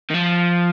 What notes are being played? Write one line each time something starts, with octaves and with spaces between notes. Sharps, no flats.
D#3
F3